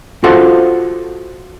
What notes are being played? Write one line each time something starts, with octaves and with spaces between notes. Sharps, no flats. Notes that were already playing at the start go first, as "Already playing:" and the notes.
F4 F#4 A4 C5 F5 F#5